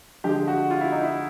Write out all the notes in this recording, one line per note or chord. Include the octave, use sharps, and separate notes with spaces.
D3 F3 G#3 G4
F#4
F4
E4
D#4
E4